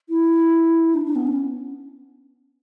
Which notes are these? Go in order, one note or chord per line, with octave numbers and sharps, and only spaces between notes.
E4
D4
D4
B3
C#4